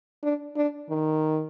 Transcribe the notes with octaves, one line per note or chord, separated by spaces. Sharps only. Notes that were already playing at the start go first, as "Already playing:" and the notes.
D4
D4
D#3